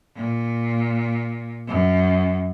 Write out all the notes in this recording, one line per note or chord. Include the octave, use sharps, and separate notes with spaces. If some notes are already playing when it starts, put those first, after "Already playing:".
A#2
F#2